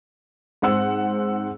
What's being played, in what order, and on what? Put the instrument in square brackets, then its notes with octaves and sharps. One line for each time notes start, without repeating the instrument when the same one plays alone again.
[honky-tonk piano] G#2 C4 F#5 E6